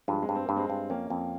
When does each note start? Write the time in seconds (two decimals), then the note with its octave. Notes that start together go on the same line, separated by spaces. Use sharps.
0.08 G2 F3 G#3
0.22 G#3 C4
0.29 G2
0.35 C4
0.46 G2 A#3
0.56 G#3 C4
0.70 G2
0.90 F2 A#3 C#4
1.10 F2